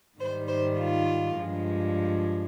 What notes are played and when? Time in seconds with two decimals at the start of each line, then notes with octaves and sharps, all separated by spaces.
0.19 G#2 D#3 G3 C5
0.48 C5
0.79 F4
1.38 G2 F3 G#3